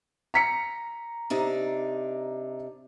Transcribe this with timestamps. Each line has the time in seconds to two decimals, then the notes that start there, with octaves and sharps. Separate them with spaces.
0.34 A#5 B6 C#7
1.30 C3 D4 D#4